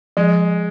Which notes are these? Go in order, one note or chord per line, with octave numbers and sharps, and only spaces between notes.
F3 G#3